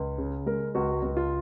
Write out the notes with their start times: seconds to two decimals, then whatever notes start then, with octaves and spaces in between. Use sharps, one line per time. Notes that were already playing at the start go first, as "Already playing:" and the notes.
Already playing: C#2
0.18 C#3
0.46 G#3 A#4
0.75 C#2 F#4
1.02 C#2
1.17 F4